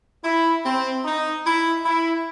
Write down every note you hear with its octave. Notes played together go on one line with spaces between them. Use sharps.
E4
C4
D#4
E4
E4